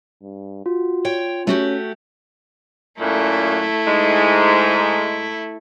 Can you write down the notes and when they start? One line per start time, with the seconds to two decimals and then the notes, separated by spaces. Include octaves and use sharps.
0.23 G2
0.66 F4 F#4
1.05 C#5 G5
1.47 A3 C#4 F#4 G4
3.00 F#2 A#2 A3 E4
3.86 G#2 G#3